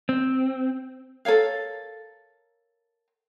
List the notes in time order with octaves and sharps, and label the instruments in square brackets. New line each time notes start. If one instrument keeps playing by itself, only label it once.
[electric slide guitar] C4
[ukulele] A4 A#4 C#5 F5